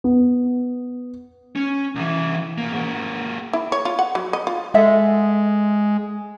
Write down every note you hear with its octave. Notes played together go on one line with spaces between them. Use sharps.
B3
C#4
C2 E3
B2 A#3
G#2 A#3
E4
C#5
F4
F#5
F#3
D#5
F4
G#3 A4 E5 F#5